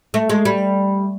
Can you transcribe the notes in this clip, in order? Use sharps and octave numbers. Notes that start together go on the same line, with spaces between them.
A3
G#3
G3